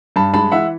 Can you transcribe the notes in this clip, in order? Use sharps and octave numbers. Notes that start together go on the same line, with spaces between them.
G2 A5 B5
G#3 A5 B5
E3 E5 F#5